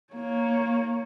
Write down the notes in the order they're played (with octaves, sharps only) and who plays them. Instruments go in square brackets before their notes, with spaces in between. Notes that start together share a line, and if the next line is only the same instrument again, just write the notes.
[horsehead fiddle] A#3 C#5